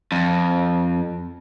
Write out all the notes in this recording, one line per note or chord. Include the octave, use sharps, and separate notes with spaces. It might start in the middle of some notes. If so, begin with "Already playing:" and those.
F2